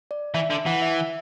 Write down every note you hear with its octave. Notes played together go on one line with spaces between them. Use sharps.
D5
E3 E5
D3
E3 F#5
E5